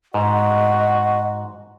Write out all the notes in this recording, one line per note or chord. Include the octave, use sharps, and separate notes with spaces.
G#2 F#4 D#5